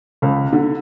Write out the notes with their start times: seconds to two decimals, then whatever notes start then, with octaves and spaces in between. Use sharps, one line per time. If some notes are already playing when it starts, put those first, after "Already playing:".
0.22 C#2
0.53 D3